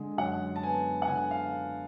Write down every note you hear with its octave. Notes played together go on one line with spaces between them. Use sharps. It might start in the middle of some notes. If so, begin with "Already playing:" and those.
Already playing: D3 G#3
F#2 F#5
A5
B3 G#5
F#5
D3 G#5
F5